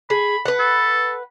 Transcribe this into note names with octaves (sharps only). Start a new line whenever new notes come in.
G#4 B5
B4 F#5
A4